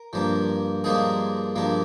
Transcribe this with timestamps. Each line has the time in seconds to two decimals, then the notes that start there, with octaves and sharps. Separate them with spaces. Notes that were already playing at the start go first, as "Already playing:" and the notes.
Already playing: A#4
0.13 G2 F3 A#3
0.84 G2 F3 G#3 A#3 G#4
1.56 G2 F3 A#3